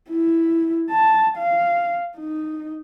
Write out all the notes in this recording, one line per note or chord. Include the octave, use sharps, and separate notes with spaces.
E4
A5
F5
D#4